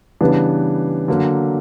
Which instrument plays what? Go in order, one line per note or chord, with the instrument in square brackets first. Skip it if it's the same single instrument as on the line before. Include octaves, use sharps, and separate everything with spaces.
[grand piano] C#3 E3 G3 B3 D4
D3 F#3 A#3